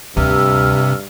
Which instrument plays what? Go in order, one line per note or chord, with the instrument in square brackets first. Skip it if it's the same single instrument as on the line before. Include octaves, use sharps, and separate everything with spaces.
[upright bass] D2 [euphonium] G2 [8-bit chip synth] C3 [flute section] E6 F6